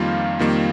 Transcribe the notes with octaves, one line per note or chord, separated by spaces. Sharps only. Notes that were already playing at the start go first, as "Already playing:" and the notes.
Already playing: F2 D#3 G3 A#3 F4 F5
F2 D#3 G3 A#3